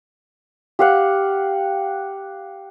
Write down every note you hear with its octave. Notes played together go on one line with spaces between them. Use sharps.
G4 F5 F#5